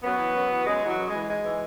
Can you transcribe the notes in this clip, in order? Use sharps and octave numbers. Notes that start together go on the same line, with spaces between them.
F#2 F#3 B3
E3
F#2
E3
F#2 G#3
E3 F#3
F#2
G#3
E3
G#2 G#3
E3